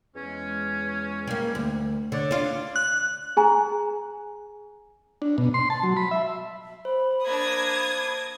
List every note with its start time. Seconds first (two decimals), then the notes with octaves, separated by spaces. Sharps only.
0.15 E2 G#3 C#4
1.27 G3 A#3
1.55 D2
2.12 D3 C#5 D5
2.31 D4 F4
2.76 F#6
3.37 G#4 G#5 A#5
5.22 D4
5.38 B2
5.54 C6
5.70 A5
5.83 F#3
5.97 B5
6.11 E5
6.85 C5 B5
7.24 A#3 D4 D#6 G#6